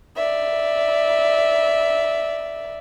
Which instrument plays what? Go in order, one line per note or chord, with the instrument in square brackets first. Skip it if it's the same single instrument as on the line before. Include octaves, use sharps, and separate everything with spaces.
[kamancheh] D5 E5